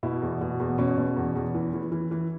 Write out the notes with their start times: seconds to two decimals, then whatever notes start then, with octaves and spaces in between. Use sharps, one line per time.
0.03 B2 E4
0.22 E2
0.41 B2
0.60 E2
0.78 B2 C#4
0.98 B2
1.16 E2
1.35 E2
1.54 E3
1.74 E3
1.92 E3
2.11 E3